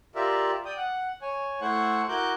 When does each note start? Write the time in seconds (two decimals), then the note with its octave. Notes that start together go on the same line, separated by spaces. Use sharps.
0.15 F4 G4 A#4 D5 E5
0.65 D5 G5 D#6
0.77 F#5
1.22 C#5 G#5
1.61 A3 E4 C5 F#5 C#6
2.09 E4 F#4 A#4 D6 F#6 G6